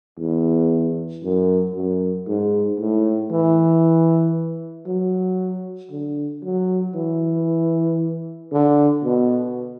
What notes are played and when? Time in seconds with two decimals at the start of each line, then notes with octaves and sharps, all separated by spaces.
0.19 E2
1.24 F#2
1.75 F#2
2.28 G#2
2.79 A2
3.31 E3
4.87 F#3
5.91 D3
6.43 F#3
6.95 E3
8.52 D3
9.04 B2